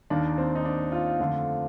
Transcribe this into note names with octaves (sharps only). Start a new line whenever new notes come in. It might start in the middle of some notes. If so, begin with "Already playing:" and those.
D#2 D#3 A#3 D4
C4
D#4
D4
F4
F2 D3 F3 A3